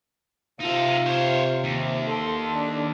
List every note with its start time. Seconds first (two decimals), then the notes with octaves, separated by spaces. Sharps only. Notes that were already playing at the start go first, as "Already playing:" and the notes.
0.60 C3 D#4 F4 A4
1.06 C5 C#5
1.64 D#2
2.07 A4 C6
2.53 D4